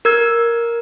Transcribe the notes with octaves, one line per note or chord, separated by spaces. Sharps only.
A#4 E6 G#6